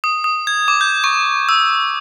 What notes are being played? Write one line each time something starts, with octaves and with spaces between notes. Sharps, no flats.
D#6
D#6
G#6
D6
G6
C#6
E6